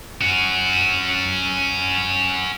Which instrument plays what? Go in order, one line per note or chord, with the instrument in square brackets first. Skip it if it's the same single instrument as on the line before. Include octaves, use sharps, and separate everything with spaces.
[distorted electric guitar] C#4 F#4